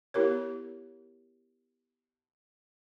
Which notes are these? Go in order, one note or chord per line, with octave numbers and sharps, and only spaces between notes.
B3 E4 G4 A#4 C#5